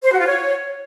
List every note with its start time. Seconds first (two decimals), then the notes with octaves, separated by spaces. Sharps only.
0.04 C5
0.11 F#4
0.19 F4
0.26 C#5